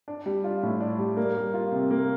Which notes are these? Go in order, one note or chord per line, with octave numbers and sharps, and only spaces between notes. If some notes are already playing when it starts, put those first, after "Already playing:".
D4
G3
F4
A2
D4
G3
A#3
G3
F4
C3
A#3